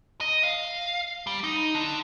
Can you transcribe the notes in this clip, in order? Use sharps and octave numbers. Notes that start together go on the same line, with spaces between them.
D#5
F5
G3
D#4
D3